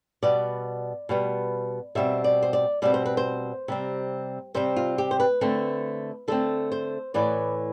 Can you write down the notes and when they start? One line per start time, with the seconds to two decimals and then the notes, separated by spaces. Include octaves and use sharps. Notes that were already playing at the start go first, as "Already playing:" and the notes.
0.22 B2 G3 B3 D5
1.09 B2 G3 B3
1.95 B2 G3 C4 E5
2.24 D5
2.43 C5
2.53 D5
2.82 B2 G3 C4 D5
2.94 C5
3.06 B4
3.17 C5
3.68 C3 G3 C4
4.54 C3 G3 C4 C5
4.76 F4
4.98 G4
5.11 C5
5.20 B4
5.41 D3 A3 C4
6.28 D3 A3 C4 A4
6.72 C5
7.14 A2 E3 B3 D5